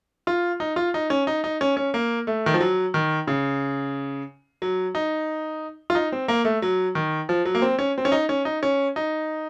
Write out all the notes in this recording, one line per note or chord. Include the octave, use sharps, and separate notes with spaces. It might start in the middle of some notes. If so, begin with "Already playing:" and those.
F4
D#4
F4
D#4
C#4
D#4
D#4
C#4
C#4
A#3
A3
D#3
F3
F#3
D#3
C#3
F#3
D#4
F4
D#4
C4
A#3
A3
F#3
D#3
F3
F#3
A#3
C4
C#4
C4
C#4
D#4
C#4
D#4
C#4
D#4